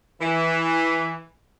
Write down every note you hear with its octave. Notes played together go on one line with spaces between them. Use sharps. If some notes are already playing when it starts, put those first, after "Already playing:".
E3